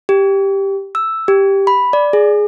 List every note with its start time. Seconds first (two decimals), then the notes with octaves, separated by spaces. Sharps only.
0.09 G4
0.95 E6
1.28 G4
1.67 B5
1.93 D5
2.13 G#4